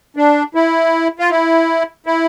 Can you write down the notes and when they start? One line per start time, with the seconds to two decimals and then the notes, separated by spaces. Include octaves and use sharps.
0.17 D4
0.55 E4
1.19 F4
1.30 E4
2.06 E4